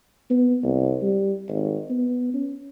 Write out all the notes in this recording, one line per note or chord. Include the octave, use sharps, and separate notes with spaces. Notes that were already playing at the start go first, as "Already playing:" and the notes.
B3
C2
G3
G#1
B3
C#4